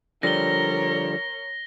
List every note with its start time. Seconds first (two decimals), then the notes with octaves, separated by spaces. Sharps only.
0.23 D3 F3 G3 A#4 C#5 A#6 G7